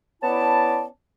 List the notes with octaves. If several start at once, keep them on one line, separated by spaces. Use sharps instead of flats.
B3 C#4 E4 D5 A5